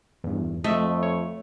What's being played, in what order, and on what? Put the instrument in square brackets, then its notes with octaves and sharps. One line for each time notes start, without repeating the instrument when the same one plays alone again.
[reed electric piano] E2 G2
[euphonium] F2 [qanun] A3 [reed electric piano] D#5 E5
[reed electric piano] C#5